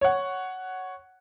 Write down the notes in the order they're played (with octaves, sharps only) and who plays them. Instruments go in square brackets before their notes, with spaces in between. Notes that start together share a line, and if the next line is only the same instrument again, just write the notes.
[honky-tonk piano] C#5 F#5